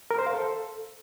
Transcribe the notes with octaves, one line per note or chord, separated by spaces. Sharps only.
A#4
C5
F5
A4